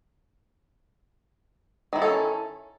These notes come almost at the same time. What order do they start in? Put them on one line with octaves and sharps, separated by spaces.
D#3 E4 F#4 A4 C#4